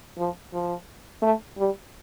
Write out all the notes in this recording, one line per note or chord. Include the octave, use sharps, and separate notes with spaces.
F3
F3
A3
G3